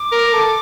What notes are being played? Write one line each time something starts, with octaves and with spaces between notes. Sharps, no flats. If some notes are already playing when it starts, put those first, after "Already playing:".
Already playing: D6
A#4
A4 D6